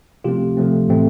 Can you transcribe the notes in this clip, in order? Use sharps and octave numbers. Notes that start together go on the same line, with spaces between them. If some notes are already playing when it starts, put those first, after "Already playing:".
C3 F3 A3 C4 F4 G4
C3 F3 A3 C4
A2 E3 A3 C4